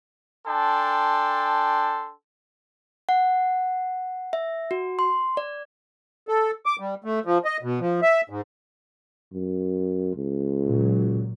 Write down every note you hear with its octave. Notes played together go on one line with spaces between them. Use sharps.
D4 A4 G5 G#5 C6
F#5
E5
F#4
C6
D5
A4
D6
G3
A3
F3
D#5
B2
F3
E5
G#2
F#2
C#2
A#2 F#3